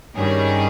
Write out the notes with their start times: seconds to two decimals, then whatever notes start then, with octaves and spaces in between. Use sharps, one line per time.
0.16 G2 D#3 G3 C#4 G#4